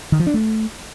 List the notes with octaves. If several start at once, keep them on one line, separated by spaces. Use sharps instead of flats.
D#3
F3
D4
A3